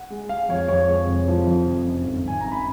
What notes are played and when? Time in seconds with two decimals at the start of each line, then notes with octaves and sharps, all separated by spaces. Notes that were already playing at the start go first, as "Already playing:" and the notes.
Already playing: F#5
0.10 G#3
0.29 G#3 F5
0.49 F2 C#5
0.68 F2 C#5
0.89 G#3
1.07 F1
1.28 F3
1.47 F2
1.66 F1
1.86 F#2
2.05 G#1
2.25 G#1 G#5
2.41 F#2 A#5
2.52 B5